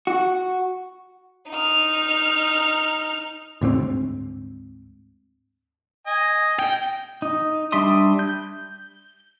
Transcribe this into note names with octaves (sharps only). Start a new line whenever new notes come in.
F#4
D#4 F6
D2 G#2 B3 C4
D#5 G#5
G5
D#4
G3 D4 E5 C6 D#6
G6